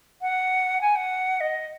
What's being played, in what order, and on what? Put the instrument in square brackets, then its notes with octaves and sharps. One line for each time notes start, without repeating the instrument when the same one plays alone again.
[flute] F#5
G#5
F#5
D#5